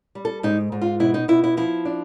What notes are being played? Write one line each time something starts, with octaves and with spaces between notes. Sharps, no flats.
G3
A4
G#2 D#4
G#2
F4
B2 E4
D#4
B2 E4
E4
F3 E4
D4